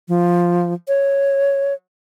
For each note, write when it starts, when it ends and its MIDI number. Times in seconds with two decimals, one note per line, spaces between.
0.08 0.73 53
0.88 1.74 73